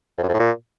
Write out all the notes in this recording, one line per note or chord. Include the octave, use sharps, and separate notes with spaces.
F2
F#2
F2
A2
A#2